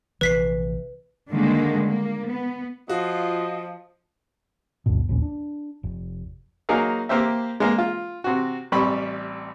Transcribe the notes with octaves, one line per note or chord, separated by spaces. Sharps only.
A#1 C3 E3 B4 B6 C7
D3 D#3 G3 G#3 A#3
A#3
B3
F3 F4 F#4 D#5
G#1 D2 G2 B2
A#1 D#2 A#2 C#4
D4
F1
F#3 A#3 D#4 G#4 A#4 F5
A#3 G4 C5 E5
G#3 A#3
F4
C3 F#4
A1 C3 G3 B5 C#6